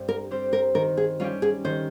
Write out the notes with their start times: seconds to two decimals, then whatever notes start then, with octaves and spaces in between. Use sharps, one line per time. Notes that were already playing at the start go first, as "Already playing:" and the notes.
Already playing: G2 G3 C4 G4 C5
0.09 A#4
0.31 G3 C4 G4 C5
0.53 A#4
0.75 D#3 A#4
0.97 G#4
1.20 G3 C#4 F4 G4
1.42 G#4
1.65 D#3 C5